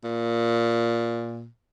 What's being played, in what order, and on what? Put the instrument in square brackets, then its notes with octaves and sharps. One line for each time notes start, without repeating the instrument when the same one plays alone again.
[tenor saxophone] A#2